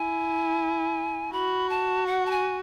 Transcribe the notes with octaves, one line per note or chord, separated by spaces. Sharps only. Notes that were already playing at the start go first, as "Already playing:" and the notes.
Already playing: E4 G#5
F#4 B5
A5
F#5
A5
G#5